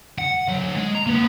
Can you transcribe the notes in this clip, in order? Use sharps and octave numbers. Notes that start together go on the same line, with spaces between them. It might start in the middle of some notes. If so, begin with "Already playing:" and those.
F#5
D3 F#3
G#3
A#5
A#3 B4